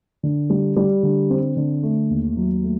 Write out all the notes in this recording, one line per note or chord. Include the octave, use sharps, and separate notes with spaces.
D3
G3
G3
D3
C4
D3
A3
D#2
F#3
A3